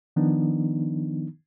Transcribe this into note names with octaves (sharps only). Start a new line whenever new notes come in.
D#3 F3 B3 D4 D#4